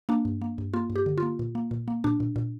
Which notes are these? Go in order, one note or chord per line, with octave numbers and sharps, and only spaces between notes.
A#3 D4
G2
A#3
G2
A#3 F4
G2
G4
D3
A#3 F4
A#2
A#3
A#2
A#3
A#2 D4
A#2
A#2